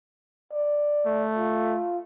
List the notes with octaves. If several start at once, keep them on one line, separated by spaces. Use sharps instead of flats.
D5
A3
F4